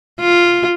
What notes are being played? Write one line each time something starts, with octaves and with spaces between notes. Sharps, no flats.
F4